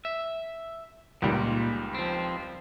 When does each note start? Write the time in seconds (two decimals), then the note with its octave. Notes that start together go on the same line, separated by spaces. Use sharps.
0.05 E5
1.22 C#2 A#2 D#3 G3
1.95 F3 C4